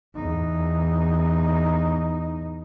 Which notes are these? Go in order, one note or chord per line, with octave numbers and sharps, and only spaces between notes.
E2 D#4